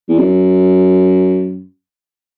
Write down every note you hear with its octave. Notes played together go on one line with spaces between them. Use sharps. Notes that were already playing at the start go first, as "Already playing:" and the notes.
E2
F#2